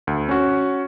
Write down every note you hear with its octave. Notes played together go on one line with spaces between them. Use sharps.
D2
C#4 F#4